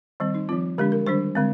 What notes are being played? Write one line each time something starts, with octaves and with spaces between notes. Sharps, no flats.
D#3 G3 C4
D#4
F3 C4 F4
D3 G#3 D4 G4
A#4
D#3 G3 D4 C5
D3 G#3 C4